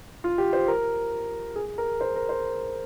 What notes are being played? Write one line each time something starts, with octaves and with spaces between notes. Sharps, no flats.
F4
G4
C5
A#4
G#4
A#4
C5
A#4
C5